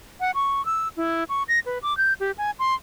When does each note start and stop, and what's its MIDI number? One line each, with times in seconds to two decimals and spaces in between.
0.21 0.31 78
0.35 0.64 85
0.66 0.88 88
0.97 1.24 64
1.29 1.43 85
1.49 1.59 94
1.66 1.79 71
1.83 1.96 86
1.97 2.13 91
2.20 2.32 67
2.38 2.51 80
2.59 2.74 84